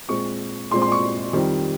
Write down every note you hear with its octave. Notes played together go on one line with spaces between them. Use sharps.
A#2 G#3 C4 C#6
A#2 G#3 C4 C6
C6
C#6
F2 D#3 G3 C4